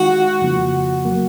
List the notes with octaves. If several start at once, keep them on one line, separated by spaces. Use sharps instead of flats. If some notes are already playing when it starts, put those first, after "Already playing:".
Already playing: D#3 G#3 D#4 F#4
F2 C#3 F3 A#3
F#3 A#3